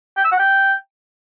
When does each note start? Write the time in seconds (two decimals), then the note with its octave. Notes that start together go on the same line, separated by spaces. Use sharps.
0.17 G5
0.25 E6
0.32 F#5
0.39 G5